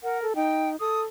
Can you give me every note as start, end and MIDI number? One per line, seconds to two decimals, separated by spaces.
0.03 0.25 70
0.03 0.21 78
0.22 0.33 69
0.36 0.76 63
0.36 0.69 79
0.80 1.04 69
0.80 1.01 87